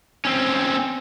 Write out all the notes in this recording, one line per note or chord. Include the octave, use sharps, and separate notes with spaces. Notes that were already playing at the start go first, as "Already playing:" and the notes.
C4 C#4